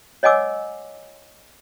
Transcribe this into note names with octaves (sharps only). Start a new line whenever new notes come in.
C#5 D#5 F#5 G#5 D6 E6